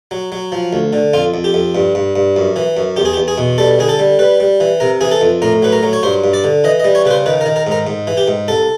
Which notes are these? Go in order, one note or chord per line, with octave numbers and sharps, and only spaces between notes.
F#3
F#3
F3
D2
D3
F2 F4
F2
G4
F2
G2
G2
G2
F#2
E3
F#2
E2 G4
G#4
G4
E2
G#4
B2
G3 A4
D3 G#4
A4
G3
G3 B4
G3
E3
C3 A#4
E3 G#4
A4
F2
A2 A#4
F#3 B4
A#4
F#3
C#5
G2 C5
G2
D5
D3
E3 D#5
D#5
G3
C#5
C#3 B4
C5
D#3 B4
A#4
D#3
A#4
G#2 A#4
G#2
E3
G4
G#2
C2 A4